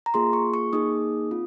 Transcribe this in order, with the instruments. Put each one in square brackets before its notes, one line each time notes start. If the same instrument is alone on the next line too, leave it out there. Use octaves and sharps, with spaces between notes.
[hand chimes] A#5
A#3 F4 G#4 C6
C#6
C#6
A#3 D#4 G#4 D#6
C4 F4